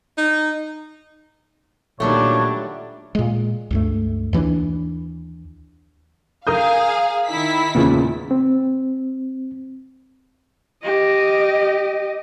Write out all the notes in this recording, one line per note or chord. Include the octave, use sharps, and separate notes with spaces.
D#4
A#2 D#3 F#3 G3 A3 D4 C#5
A#2 G#3
C#2 G2 A3
D#2 E3 A3 D4
G#4 A#4 F5 D#6 G6
D#3 E4 B6
E2 A#2 C#3
C4
G4 D#5